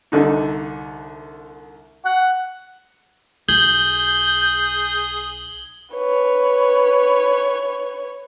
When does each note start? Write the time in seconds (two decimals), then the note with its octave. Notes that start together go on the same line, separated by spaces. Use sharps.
0.12 C2 D3 D#4
2.05 F#5
3.49 B1 G#4 G6 G#6 F#7 G7
5.95 B4 C#5